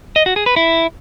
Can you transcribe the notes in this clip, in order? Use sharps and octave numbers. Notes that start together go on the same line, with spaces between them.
D#5
F#4
G#4
B4
E4